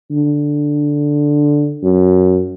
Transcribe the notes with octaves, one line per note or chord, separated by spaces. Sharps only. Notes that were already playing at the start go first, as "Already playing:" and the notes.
D3
F#2